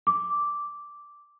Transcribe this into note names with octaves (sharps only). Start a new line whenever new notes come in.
D6